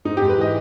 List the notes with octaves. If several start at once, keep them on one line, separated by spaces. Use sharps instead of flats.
G#2 D#4
G#2 G4
B4
E3 D#5